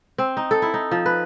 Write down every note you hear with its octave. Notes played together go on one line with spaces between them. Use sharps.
C4
D#4
A4
E4
D#4
F3
B4